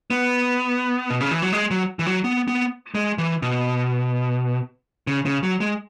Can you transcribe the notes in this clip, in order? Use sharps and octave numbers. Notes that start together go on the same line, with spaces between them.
B3
B2
C#3
E3
F#3
G#3
F#3
E3
F#3
B3
B3
G#3
E3
B2
C#3
C#3
F#3
G#3